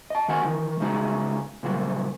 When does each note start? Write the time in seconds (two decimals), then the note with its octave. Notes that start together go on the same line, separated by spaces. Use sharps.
0.10 D#5 A5
0.28 D#3 F#4 F#5 G#5
0.44 D#3 E3
0.80 C#3 G#3 D#4 F#4 G#4
1.63 A#2 C#3 F#3 G3 F#4